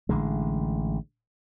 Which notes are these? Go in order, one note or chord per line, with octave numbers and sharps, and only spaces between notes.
A1 D3 G#3